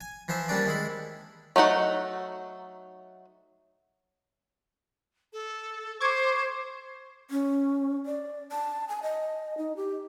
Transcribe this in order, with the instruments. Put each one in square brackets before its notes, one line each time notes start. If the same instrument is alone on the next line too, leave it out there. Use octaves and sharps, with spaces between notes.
[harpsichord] G#5
E3 F3 C5 E5
G3 A#3 C#4 D4 D5
D#3 G#3 E4 B5
[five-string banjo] F#3 A3 D#4 F#5
[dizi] A4
[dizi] C5 [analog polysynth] C#6 D6 G#6
[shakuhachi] C#4
D5
A5
G#5
D#5
D#4
G4